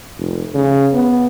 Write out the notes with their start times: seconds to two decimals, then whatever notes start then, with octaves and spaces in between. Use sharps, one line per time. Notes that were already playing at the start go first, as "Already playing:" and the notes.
0.18 F1
0.55 C#3
0.93 B3